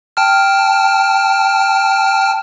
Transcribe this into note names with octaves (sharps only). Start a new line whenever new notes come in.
G5 A5 F6